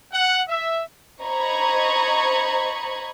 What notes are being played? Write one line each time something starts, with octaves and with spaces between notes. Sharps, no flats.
F#5
E5
C5 D#5 A#5 B5 C#6 G#6